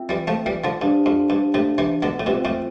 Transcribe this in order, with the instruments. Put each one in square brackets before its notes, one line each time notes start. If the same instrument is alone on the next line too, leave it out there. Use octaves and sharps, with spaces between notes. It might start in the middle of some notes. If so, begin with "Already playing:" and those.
Already playing: [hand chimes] C4 F4 A4 E5 G5
[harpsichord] E3 G3
F3 A3
E3 G3
D3 F3
[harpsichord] G2 [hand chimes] D4 G4 C5 F5 A5
[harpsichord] F2
G2
A2 C3
C3 E3
B2 D3
A2
[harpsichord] G2 B2 [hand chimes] C4 F4 C5 E5 G5
[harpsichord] F2 A2